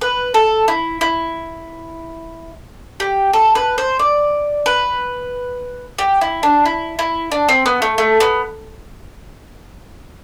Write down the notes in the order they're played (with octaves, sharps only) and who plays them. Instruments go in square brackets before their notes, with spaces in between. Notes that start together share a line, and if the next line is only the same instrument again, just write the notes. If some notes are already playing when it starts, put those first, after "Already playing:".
[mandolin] B4
A4
E4
E4
G4
A4
B4
C5
D5
B4
G4
E4
D4
E4
E4
D4
C4
B3
A3
A3
B3